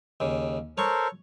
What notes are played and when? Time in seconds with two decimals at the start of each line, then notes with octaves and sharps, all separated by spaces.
0.20 D#2 C#3
0.78 A4 A#4 C5 C#5 C#6